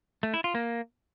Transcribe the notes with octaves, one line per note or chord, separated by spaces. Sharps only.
A3
E4
F4
A#3